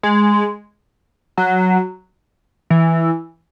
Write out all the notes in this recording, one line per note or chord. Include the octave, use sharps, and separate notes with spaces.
G#3
F#3
E3